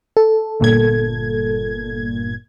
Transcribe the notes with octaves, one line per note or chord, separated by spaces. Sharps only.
A4
G1 A#2 G#6